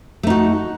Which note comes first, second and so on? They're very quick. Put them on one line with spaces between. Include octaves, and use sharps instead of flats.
A3 D#4 F#4